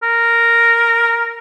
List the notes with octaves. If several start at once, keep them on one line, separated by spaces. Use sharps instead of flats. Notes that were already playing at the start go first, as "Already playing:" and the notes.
A#4